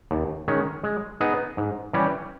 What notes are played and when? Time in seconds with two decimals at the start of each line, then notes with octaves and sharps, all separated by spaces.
0.11 D#2
0.48 D#3 G#3 C#4
0.84 G#3
1.20 B3 D#4 G#4 D#5
1.57 G#2
1.93 E3 G3 C#4 G4